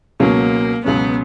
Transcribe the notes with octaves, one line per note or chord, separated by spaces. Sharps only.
C#2 B2 F#3 A#3 C#4
C#2 B2 F#3 B3 C#4